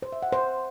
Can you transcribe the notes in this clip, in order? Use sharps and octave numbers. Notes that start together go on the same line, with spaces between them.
C5
E5
F#5
C5